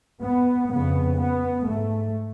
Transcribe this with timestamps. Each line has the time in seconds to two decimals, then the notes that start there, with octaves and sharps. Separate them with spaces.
0.23 B3
0.72 F2 C#3 B3
1.20 B3
1.68 G#2 A3